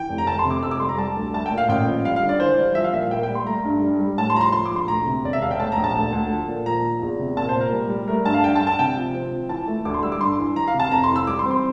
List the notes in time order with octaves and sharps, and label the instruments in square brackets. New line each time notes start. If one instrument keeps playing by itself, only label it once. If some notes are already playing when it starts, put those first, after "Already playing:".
Already playing: [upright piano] E3 [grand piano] G5
[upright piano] F1
[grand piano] A#5
[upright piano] F1 [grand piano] A5
[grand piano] C6
[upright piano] C3
[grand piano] D6
[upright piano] F2 [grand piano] E6
[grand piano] D6
[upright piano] G3 [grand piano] C6
[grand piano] A#5
[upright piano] G3 [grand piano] A5
[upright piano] D2
[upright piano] A3 [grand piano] A5
[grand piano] G5
[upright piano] A#2
[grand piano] F5
[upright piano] A1 [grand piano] G5
[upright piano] F3
[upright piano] G3 [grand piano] F5
[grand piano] F5
[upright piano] D3
[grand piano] D5
[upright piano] E3 [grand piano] C5
[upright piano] G3
[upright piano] F3 [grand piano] E5
[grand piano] F5
[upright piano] A#2 [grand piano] E5
[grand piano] F5
[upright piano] A#3 [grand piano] G5
[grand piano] G5
[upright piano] G3
[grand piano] C6
[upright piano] A3 [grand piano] A#5
[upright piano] G2
G3
G3
[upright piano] A2 [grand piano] A5
[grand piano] C6
[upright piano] F3 [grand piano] A#5
[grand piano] C6
[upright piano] F3 [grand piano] C6
[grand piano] D6
[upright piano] A#1
[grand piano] C6
[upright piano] D2 [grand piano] A#5
[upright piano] C3
[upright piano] E1 [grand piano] D5
[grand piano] E5
[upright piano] E1 [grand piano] F5
[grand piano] G5
[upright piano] A3 [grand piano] A5
[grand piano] A#5
[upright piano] A#1
[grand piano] A5
[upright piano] D2
D2
F3
A#2
[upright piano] F3 [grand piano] A#5
[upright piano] F3
E2
C3
[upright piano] A#2 [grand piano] A5
[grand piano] C5
[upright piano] A#2
[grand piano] A#4
[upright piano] G3
G3
[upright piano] A3 [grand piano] A#4
[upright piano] G2 [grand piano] A5
[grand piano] F5
[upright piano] D4 [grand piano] G5
[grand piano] A5
[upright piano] G2
[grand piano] A5
[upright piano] C3 [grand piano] G5
[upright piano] F3
C4
F3
[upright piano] E3 [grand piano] A5
[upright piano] A3
[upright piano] D2 [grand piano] D6
[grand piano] C6
[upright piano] G3 [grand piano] E6
[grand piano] D6
[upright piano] G2 [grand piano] C6
[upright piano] E3
[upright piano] E3 [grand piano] A#5
[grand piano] F5
[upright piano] C3
[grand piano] A5
[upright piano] F2 [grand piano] A#5
[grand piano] C6
[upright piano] E3
[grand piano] E6
[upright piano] G3 [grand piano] D6
[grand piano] C6
[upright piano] C4
[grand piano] C6